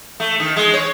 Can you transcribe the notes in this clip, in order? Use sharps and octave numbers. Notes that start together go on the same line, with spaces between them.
A3
D#3
G#3
C#5